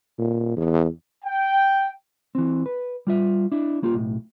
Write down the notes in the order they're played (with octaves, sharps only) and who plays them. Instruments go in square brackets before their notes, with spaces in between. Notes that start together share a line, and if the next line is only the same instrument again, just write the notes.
[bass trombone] A#2
E2
[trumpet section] G5
[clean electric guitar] E3 C4
B4
G3 F4 E5
D4 E4
A#3 F4 G4
B1 A2